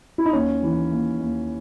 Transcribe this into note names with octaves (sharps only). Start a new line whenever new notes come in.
E4
D#4
D#2 C#4
E3
D#2
D#2